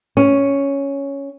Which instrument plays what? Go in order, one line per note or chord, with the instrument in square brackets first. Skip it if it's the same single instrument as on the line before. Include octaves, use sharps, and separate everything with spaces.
[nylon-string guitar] C#4